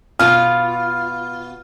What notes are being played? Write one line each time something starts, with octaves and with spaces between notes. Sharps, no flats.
B2 F4 F6